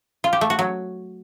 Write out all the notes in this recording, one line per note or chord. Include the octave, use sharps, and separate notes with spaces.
F4
G4
A3
F#4
F#3